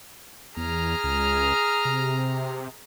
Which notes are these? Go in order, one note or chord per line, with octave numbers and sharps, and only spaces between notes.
E2 G#4 A#5 F6
C#2
C3